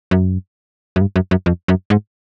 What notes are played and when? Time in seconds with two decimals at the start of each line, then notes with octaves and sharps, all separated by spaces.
0.11 F#2
0.96 F#2
1.01 G2
1.16 F#2
1.31 F#2
1.46 F2
1.68 F#2
1.90 G#2